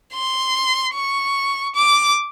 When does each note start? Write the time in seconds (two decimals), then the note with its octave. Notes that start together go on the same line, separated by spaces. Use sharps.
0.14 C6
0.94 C#6
1.75 D6